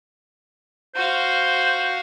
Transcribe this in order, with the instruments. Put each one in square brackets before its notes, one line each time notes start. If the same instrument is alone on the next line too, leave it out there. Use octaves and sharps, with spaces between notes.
[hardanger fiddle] F#4 F5 [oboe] C5